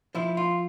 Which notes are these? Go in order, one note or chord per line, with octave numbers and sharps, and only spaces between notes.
F3 E4
F4